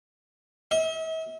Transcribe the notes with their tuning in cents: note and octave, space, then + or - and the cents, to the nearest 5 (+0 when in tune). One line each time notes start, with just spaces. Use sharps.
E5 -45